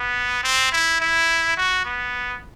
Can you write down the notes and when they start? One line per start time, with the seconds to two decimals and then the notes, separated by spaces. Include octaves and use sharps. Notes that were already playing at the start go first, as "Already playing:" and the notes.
Already playing: B3
0.44 C4
0.72 E4
1.01 E4
1.57 F#4
1.85 B3